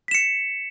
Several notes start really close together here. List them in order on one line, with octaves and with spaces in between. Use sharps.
B6 E7 C#7